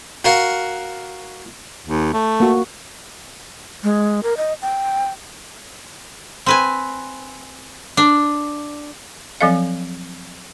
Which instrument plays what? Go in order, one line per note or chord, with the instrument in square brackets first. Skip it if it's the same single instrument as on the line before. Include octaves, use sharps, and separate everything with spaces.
[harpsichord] F#4 A#4 F5 F#5
[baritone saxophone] D#2
A3
[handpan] A#3 F#4
[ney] G#3
A#4
D#5
G5
[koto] C4 B4 G#5
D4
[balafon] F3 F#3 C4 A4 D#5 F5